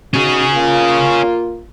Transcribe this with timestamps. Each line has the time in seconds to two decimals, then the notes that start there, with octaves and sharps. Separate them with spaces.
0.14 E2 C#4 D#4 F#4 G#4
0.53 A#3 F4